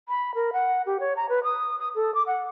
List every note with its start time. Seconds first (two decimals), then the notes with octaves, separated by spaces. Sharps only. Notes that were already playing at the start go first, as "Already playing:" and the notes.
0.09 B5
0.35 A#4
0.53 F#5
0.86 G4
1.00 C#5
1.16 A#5
1.29 B4
1.43 D#6
1.79 D#6
1.95 A4
2.14 D6
2.27 F#5